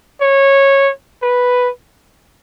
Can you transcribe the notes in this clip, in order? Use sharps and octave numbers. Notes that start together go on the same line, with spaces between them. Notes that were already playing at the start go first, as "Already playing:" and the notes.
C#5
B4